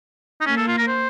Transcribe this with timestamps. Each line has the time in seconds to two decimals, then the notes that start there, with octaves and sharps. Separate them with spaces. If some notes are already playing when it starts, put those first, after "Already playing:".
0.41 D#4
0.46 A#3 C#4
0.57 A4
0.68 F4
0.78 A#4
0.88 C5